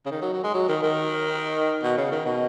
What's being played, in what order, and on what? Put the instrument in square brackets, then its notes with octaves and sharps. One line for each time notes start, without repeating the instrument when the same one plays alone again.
[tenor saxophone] C#3
D#3
F#3
F#3
G#3
F#3
D#3
D#3
B2
C#3
D#3
B2